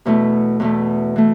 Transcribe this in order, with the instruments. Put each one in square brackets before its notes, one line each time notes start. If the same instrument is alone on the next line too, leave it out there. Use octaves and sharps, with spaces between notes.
[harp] E2 B2 A3 E4
E2 B2 A3
E3 A3